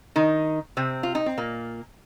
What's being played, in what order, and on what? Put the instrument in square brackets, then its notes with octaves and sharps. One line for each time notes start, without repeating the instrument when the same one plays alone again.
[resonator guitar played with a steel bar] D#3 D#4
C3 C4
F4
D#4
C4
A#2 A#3